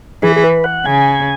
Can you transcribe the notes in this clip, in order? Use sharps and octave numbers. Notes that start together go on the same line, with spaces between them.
E3 G#4
G#4
B4
F#5
C#3 G#5